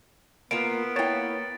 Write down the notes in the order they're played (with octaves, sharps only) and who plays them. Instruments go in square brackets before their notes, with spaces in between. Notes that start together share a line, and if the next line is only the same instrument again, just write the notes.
[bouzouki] A#3 F4 [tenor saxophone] B3 [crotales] D7
[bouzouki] A#3 G5 [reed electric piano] E4 C#5 [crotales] A6